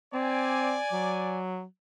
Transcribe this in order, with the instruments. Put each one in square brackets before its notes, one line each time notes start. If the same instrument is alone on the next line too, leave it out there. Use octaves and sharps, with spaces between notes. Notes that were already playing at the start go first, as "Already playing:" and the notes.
[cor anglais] C4 [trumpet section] D5 G#5
[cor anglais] F#3